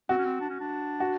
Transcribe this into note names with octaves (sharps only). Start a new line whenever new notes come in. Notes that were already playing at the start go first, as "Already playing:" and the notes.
C4 F#4
C#4
C4
D4
C#4
D4
F#4